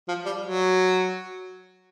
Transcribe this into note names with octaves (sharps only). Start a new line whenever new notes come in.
F3
G3
F#3